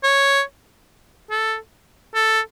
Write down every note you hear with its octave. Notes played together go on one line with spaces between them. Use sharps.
C#5
A4
A4